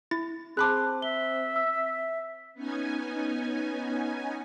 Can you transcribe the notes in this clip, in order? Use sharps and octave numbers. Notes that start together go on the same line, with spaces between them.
E4 A6
C4 G#4 A5 B5 C6 D6 F#6
E5 G7
E6
B3 C#4 D#4 G#5